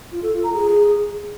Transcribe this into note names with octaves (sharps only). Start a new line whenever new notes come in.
F4
A4
F4
A#5
G#4